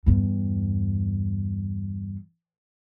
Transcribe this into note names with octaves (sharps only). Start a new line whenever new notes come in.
E2 G2